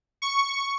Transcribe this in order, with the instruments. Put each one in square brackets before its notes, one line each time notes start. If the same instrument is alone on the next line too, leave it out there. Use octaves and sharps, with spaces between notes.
[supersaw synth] C#6